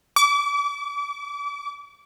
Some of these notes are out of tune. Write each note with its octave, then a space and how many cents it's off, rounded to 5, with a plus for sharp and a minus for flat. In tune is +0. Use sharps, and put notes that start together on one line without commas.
D6 -35